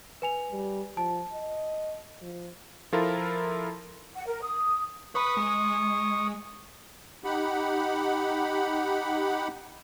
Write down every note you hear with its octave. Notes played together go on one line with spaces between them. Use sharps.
B4 G#5 F7
G3
F3 A5
D#5
F3
F3 E4 F4 A4 A#4
F#5
A#4
D#6
B4 B5 C#6 D#6
G#3
D#4 G4 F#5 B5